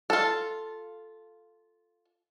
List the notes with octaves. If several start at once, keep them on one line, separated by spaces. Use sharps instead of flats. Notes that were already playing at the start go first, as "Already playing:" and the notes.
F4 A4